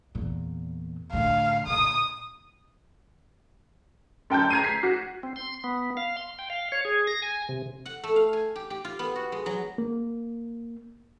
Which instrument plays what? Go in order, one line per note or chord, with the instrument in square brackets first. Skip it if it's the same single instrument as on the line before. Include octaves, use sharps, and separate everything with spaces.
[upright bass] E2 A#2
[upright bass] A2 D3 [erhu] F5
[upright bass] A#2 D3 [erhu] D#6
[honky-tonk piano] F#2 G5 A5 G6
A#5 G#6 C7 D#7
B6 C7
F#4
[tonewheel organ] C4
C6
B3
F5
C6
G5
F5
C#5
G#4
A#6
G#5
C3
[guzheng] F#5
A3
F5
G#5
G4
G4
F4
B3
F#4
G#3
F#3
[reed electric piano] A#3